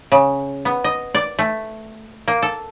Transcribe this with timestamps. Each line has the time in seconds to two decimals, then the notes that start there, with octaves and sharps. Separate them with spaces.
0.12 C#3
0.65 B3
0.84 D#5
1.15 D5
1.39 A3
2.28 A#3
2.42 A4